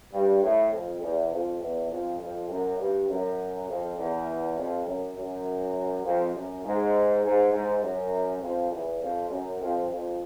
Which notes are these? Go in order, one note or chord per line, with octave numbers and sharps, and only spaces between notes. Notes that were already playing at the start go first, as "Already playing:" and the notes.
G2
A2
F2
E2
F2
E2
F2
F2
F#2
G2
F#2
F2
E2
F2
F#2
F#2
F2
F#2
G#2
G#2
G#2
F#2
F2
E2
F2
F#2
F2
F2